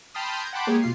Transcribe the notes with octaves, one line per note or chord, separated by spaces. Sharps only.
G5 A5 B5 C6 D#6 F6
G6 G#6 A#6
F#5 G5 A5 B5 C6 D6
G#3 A#3 G4 G#4 C#5
B2 F4 C7